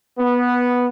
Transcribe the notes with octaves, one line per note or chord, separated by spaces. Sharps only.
B3